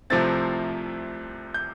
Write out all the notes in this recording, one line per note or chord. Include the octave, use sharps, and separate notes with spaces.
C2 C3 F3 A3 C4 A6
G6